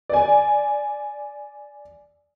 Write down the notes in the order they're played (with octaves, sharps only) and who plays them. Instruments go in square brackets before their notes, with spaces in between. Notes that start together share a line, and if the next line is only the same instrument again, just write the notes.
[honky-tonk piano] D5 G#5